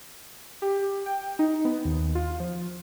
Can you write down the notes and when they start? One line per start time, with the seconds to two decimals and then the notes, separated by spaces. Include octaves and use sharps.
0.62 G4
1.06 G5
1.39 D#4
1.65 B3
1.85 D#2
2.15 F4
2.40 F3